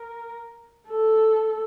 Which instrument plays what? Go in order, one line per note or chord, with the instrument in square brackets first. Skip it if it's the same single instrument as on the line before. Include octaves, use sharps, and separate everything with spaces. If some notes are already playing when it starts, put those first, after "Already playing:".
Already playing: [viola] A#4
A4